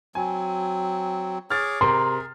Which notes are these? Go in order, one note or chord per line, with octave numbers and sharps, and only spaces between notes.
F#3 C4 G#5
G#4 C#5 D6 F6 A6
C3 G#4 A#4 C6